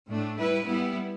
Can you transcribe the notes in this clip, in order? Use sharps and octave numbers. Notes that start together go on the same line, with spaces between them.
A2 A3 D4
G3 E4 B4
G3 B3 E4